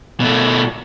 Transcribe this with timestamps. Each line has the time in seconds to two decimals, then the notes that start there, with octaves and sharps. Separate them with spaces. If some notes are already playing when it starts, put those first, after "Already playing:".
0.20 B2 A3